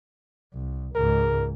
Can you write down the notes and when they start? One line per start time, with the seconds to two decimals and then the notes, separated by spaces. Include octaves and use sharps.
0.53 C2
0.95 C#2 G#2 A#4